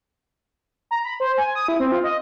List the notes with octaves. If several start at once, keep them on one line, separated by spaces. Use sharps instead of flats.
A#5
B5
C5
G#5
D#6
E4
C4
F4
D#5